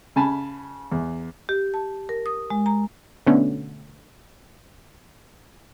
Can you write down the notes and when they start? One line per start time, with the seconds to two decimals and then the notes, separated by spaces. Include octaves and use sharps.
0.16 C#3 G#5 A5 B5
0.92 E2
1.49 G4
1.74 A5
2.09 A#4
2.26 D#6
2.50 G#3
2.66 A#5
3.27 B2 D3 A3 B3 C#4